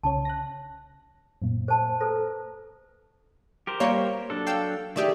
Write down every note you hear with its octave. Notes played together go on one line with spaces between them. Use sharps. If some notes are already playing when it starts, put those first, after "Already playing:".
C2 C#3 C#5 A5
F#6 A#6
F#2 A#2
C5 A5
A4 B4 C5 A#5
G4 A#4 C5
G3 A#3 C#5
F#3 D4 A4
F5 G5 E6
D#3 A3 G4 G#4 D5 E5